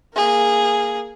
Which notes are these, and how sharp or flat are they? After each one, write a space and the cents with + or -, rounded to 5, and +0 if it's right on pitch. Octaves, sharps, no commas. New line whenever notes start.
A#3 +0 G#4 -10